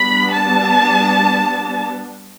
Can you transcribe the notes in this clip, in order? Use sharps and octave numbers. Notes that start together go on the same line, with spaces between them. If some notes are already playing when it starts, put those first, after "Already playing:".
Already playing: G3 B3 D4 B5
A5